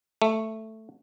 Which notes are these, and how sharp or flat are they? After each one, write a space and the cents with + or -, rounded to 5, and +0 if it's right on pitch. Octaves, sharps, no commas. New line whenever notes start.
A3 +5